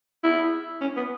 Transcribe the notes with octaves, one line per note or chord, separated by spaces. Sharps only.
E4
C#4
B3